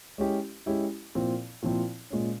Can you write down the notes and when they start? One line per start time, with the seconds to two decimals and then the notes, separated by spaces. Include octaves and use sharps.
0.18 G#3 C#4 E4 G4
0.66 G#3 C#4 E4 G4
1.15 A#2 F3 C4 E4
1.62 A#2 F3 C4 E4
2.10 A#2 G#3 C#4